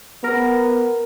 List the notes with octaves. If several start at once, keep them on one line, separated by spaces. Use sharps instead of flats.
B3 A#4